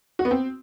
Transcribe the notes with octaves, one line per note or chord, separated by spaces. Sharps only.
F#4
B3
C4